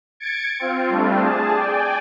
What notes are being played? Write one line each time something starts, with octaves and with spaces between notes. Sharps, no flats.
G#6 A6 C#7 D7
C4 F4
G3 A3 C4 D4 F4
G#4 A5
D5 G5 G#5